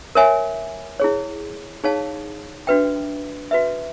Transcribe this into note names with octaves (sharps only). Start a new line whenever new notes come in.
A#4 C#5 E5 G#5
E4 G#4 C#5
D#4 G#4 C#5 F5 A5
D4 F#4 B4 E5 G5
F#4 B4 E5